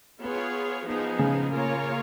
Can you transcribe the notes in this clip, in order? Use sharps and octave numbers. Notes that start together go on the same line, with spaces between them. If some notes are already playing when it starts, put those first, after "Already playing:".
B3 F4 G#4 C#5
F3 B3 D#4 G#4
C#3
A#3 F4 A#4 C#5